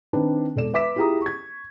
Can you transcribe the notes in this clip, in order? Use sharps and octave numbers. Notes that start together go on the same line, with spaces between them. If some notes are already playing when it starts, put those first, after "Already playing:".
D#3 C4 D4 B4
E1 A4 D5 E7
B4 E5 D6 B6 E7
E4 F4 G4 G#4 A#5 D#6
C#6 G#6